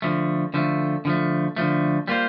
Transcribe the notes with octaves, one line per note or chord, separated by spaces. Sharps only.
D3 F3 A3
D3 F3 A3
D3 F3 A3
D3 F3 A3
G3 A#3 F4 C5